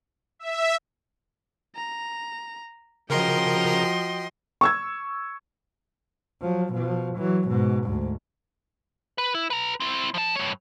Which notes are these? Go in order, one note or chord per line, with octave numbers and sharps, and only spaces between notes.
E5
A#5
C#3 F3 F#4 A#4 D#5 G5 A#5 C6
C#6 E6 G#6
F3 F#3
B2 F3
E3 F#3
G#2 B2
D2 G#2
B4
E4
B4 A#5
C4 E4
F3 A5
G2 C#5